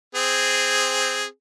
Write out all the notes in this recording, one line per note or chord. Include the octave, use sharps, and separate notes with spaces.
C4 G#4